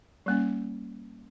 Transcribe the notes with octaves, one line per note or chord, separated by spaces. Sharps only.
G3 A#3 C#4